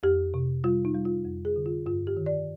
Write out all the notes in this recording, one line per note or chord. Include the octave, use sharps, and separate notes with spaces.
F2 G4
C3
G3 F4
D#4
G3
F4
F2
G#4
D3
F4
G2 F4
G4
D#3
D5